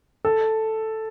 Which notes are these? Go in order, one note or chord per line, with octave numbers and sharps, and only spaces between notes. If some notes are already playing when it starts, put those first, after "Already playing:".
A4